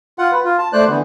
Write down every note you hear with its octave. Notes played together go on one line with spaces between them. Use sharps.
F4 F#5
B4
F4
A5
A3 C5 D5 F#6
D3 E3 B3